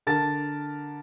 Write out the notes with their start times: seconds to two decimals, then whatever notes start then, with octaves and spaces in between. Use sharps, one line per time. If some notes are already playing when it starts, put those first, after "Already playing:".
0.07 D3 A#4 A5 A6